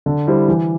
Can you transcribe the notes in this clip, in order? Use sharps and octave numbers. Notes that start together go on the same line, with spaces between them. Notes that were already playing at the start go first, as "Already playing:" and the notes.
D3
G3 E4 C5
E3